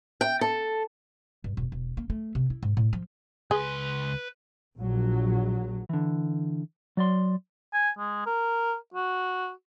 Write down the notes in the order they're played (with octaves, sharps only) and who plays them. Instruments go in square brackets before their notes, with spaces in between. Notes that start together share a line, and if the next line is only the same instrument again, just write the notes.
[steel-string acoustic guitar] G5
A4
[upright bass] G2
E1
E1
A#3
A3
C3
E4
G#2
A2
F3
[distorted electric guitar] C#2 C6 [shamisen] G#4 [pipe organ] B4
[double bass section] A#1 F#3
[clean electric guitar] D3 E3
F#3 D5 C6
[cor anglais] G#5
G#3
A#4
F#4